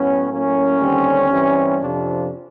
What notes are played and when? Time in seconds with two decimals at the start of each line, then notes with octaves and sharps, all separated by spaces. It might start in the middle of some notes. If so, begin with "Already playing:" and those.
Already playing: A2 F#3 B3 C#4
0.30 A2 F#3 A#3 C#4
0.80 D#2 D3 G3 C4
1.30 G2 E3 G3 C4
1.80 F2 C3 F3 D4